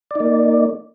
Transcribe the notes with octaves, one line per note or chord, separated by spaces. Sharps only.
A#3 D#4 D5